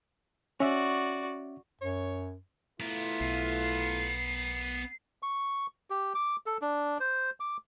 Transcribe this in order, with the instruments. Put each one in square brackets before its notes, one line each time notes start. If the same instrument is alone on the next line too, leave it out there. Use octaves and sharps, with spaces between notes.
[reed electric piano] C#4 E5 [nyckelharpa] F#4 D5
[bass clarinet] F#2 [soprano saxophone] C#5
[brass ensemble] A3 E4 F4 [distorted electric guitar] B3 A#4
[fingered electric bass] B1 [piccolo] C7
[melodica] C#6
G4
D6
A4
D4
C5
D6